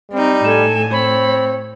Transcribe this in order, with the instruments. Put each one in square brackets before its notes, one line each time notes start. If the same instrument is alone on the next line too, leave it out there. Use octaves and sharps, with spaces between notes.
[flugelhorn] G3 [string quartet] C4 D#4
[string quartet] A2 [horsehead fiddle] A4 G#5 [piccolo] E7
[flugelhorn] C4 [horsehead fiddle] C#5 [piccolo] B5